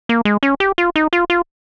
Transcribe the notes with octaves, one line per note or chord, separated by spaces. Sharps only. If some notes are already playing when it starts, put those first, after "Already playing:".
A#3
G#3
C#4
G4
F4
D#4
F4
F4